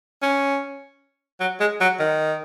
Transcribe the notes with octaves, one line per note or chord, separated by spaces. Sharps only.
C#4
F#3
G#3
F#3
D#3